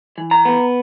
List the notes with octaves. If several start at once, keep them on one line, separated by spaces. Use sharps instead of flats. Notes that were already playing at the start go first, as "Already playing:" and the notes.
E3
A#5
B3